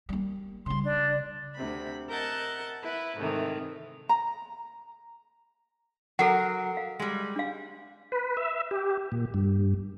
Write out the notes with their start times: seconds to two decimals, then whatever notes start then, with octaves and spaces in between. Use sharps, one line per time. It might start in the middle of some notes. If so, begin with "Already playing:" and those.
0.09 G3 A#3
0.66 C#3 G3 C6
0.85 D4 D5
1.54 D2 C3 B5
2.09 A#4 D#5 E5 F#5 A5 G6
2.82 E4 B4 B5
3.17 G#2 C3 D#3 E3 A3
4.09 A#5
6.19 F#3 A4 A#4 F#5
6.77 F5
6.99 G3 G#3
7.36 D4 F5
8.12 B4
8.37 E5
8.71 G4
9.12 A#2
9.34 G2